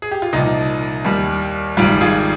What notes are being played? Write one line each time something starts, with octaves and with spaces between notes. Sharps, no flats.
G#4
G4
F4
C2 A#2 F3 D#4
D#2 D#3 G3
G#1 G#2 G3 F4
F4 G#4